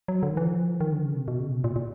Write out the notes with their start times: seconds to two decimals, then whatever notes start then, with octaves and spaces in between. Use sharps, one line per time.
0.08 F#3
0.23 D3
0.30 D#3
0.37 E3
0.45 F3
0.80 D#3
0.92 D3
1.04 C#3
1.16 C3
1.28 B2
1.40 C#3
1.52 B2
1.64 A#2
1.76 A#2